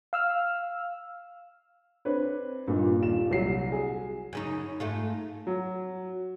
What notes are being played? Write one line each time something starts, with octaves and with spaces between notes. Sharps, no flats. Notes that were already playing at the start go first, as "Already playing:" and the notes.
F5 E6 F6
C4 D4 B4 C#5
G2 A#2 A#3 D#4
D#1 F4 E7
C2 F#3 C7
G#4
F#2 C#3 D#4
G#2 A3 F4
F#3